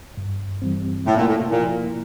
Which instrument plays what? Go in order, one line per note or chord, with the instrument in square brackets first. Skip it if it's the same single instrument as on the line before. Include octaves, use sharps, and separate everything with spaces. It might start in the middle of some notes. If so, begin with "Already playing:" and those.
[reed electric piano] G2
E3 G3 C4
[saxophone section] A2 [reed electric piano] C3
[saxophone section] A#2
A2
[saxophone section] A#2 [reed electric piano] F3 A#3 E4